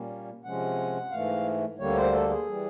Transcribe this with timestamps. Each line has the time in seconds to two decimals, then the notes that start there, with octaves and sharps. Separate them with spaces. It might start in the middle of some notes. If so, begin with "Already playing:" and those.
Already playing: A#2 G3 A#3 C#4
0.44 C3 F3 G#3 C#4 F#5
1.11 G#2 E3 A3 F5
1.78 D2 D3 G3 A#3 C#5
1.96 C5
2.13 A4
2.29 G#4
2.46 E3 G3